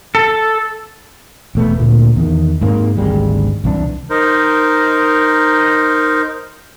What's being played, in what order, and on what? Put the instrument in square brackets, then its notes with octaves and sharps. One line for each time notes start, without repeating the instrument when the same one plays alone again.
[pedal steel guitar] A4
[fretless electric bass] E1 A3 B3
D2 A#2
E2 D#3
G#2 C3 A#3
G#1 D2 G3 G#3
C2 E3 F3 D4
[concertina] D#4 A#4 C5